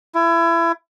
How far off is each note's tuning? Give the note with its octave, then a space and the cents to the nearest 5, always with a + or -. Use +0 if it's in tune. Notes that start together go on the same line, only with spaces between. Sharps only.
E4 +25